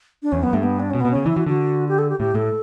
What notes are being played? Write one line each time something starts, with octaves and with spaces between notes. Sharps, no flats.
D4
E2 C#4
F#2 B3
G2 A3
B3
D4
B2 C#4
B2 B3
C#3 C#4
E3 E4
E3 F#4
D3 F#4
G4
A4
G4
A2 G4
A2 A4